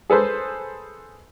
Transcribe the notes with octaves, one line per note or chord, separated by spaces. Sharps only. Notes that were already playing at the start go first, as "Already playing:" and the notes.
G#4 A4 B4 C5